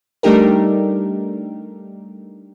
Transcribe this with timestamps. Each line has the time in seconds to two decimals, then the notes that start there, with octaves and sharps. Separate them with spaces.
0.23 G3 A3 D4 D#4 G4 A#4